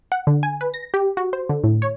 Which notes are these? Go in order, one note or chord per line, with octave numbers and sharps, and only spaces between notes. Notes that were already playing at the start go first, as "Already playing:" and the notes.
F#5
D3
G#5
B4
A#6
G4
F#4
C5
D3
A2
C#5